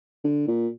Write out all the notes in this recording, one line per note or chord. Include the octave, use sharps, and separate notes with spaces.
D3
A#2